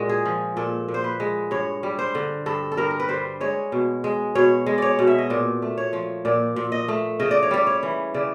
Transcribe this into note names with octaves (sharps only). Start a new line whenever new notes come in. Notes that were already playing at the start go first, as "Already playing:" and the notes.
Already playing: A#2 G#3 F#4
G#4
F3
A#2 A4
A#2
C5
B4
G#3
G2 C#5
G3
C5
D3
G2 A4
A4
G2 A#4
A#4
B4
G3 C5
G#3 C#5
B2
G#3
B2 C#5
G#3
C#5 D5
B2
E5
D#5
A#2 D5
A3
C#5
F3
A#2 D5
A#2
D#5
A3
C#3 D#5
D5
C#5
G3 D5
C#5
E3
C#3 D5